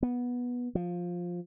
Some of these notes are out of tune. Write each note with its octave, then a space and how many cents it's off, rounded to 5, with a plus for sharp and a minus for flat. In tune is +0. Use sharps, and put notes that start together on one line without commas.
B3 -10
F3 +10